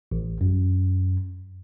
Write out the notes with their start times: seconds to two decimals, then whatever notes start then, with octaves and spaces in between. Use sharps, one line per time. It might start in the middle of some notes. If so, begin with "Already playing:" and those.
0.12 A1
0.41 F#2